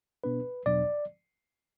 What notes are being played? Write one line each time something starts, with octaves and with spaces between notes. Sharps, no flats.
B2 B3 D4 B4
E2 B2 F#3 B3 D4 D5